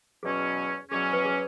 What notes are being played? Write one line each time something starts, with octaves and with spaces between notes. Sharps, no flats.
E2 B2 F#3 C#4 G#4
E2 B2 F#3 C#4 G#4
B4
G#4